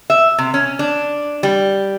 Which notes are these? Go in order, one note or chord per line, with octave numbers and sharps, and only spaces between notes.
E5
C3
C#4
D4
G3